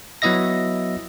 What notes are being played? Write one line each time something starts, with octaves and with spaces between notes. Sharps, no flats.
F#3 B3 E4 D#5 E5 A#6